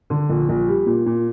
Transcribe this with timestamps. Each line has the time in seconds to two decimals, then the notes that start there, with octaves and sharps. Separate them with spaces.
0.10 D3
0.30 A#1
0.49 A#1
0.68 G3
0.86 A#2
1.06 A#2